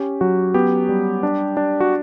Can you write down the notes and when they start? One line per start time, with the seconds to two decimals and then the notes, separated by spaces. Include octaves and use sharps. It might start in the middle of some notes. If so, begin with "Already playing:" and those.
Already playing: C#4 G4
0.21 F#3 F#4
0.54 B3 G4
0.89 G3
1.23 D4
1.57 D4
1.80 F#4